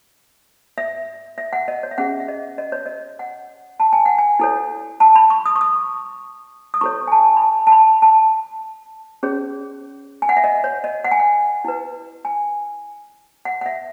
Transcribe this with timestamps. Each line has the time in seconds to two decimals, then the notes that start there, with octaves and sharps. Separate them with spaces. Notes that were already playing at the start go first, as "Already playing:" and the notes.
0.78 E5
1.38 E5
1.53 F#5
1.68 D#5
1.83 C#5
1.91 E5
1.98 C#4 G#4 C#5 F#5
2.20 E5
2.28 D#5
2.58 D#5
2.72 C#5
2.86 D#5
3.19 F#5
3.80 A5
3.93 G#5
4.06 F#5
4.18 G#5
4.40 E4 A4 C#5
5.00 A5
5.16 B5
5.30 C#6
5.46 D#6
5.56 C#6
5.61 D#6
6.74 D#6
6.81 E4 A4 C#5 C#6
7.07 G#5
7.12 A5
7.37 B5
7.42 A5
7.67 A5
7.72 B5
8.02 A5
9.23 C#4 G#4 C#5
10.22 G#5
10.29 F#5
10.37 E5
10.44 D#5
10.64 C#5
10.84 D#5
11.04 F#5
11.12 G#5
11.19 F#5
11.65 E4 B4
12.25 G#5
13.45 F#5
13.61 F#5
13.66 E5